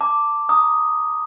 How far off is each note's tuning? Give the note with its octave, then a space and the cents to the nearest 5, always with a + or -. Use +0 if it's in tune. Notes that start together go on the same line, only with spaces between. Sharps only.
A5 +20 D6 +0
A#5 +0 D#6 +0